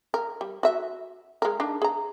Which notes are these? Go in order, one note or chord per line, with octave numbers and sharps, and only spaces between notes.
A#4
G3
F#4 E5
G#3 A#4
D4 D#4
G#4 A#5